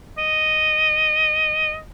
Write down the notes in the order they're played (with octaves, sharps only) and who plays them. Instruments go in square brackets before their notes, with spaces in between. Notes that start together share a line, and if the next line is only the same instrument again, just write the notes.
[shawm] D#5